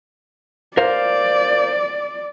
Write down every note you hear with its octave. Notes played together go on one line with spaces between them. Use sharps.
A#4 C5 D5 F5